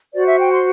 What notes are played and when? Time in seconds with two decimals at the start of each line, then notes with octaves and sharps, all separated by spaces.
0.13 F#4 C5 D5
0.26 E5
0.39 G5
0.53 C6